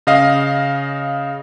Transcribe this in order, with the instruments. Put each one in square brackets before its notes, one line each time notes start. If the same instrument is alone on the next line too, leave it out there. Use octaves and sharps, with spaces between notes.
[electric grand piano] C#3 D#5 F5